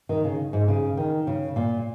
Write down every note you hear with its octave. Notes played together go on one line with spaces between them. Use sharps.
D#3
C#3
G#2
C#3
D#3
C#3
A#2